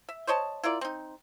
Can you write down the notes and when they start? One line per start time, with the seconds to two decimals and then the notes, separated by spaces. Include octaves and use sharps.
0.09 E5
0.27 C5 C#5 D#5 A5
0.63 E4 F4 A#4 D5
0.81 C4 D#4